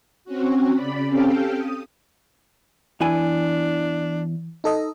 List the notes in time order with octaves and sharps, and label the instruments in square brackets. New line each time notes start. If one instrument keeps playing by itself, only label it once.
[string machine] C4 C#4 F#4
C#3 D5 B5
C4 C#4 G4 A4 F5 G5
D#6
[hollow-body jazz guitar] E2 E4 G#5 [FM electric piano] E3 [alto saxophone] D4
[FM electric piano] D#4 A4 D#5